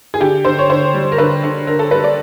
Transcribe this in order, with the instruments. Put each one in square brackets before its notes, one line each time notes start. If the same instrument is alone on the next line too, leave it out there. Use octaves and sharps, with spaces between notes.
[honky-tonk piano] G#4
D3 G4
D3 C5
C#5
D3 C5
G3
A#4
D3 B4
D3
D3 A#4
A4
G3 B4
D5